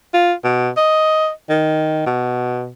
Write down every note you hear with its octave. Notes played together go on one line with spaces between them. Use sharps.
F4
B2
D#5
D#3
B2